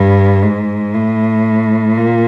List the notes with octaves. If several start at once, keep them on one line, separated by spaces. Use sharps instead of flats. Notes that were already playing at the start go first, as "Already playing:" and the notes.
Already playing: G2
G#2
A2
A#2